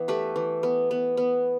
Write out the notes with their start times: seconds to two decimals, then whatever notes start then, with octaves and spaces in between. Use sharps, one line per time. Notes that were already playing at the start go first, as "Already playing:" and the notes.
Already playing: E3 B3
0.08 A3 G4 B4
0.36 E3
0.63 B3
0.91 B3
1.17 B3